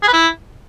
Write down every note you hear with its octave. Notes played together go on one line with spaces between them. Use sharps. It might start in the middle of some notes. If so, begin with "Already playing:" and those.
G#4
B4
E4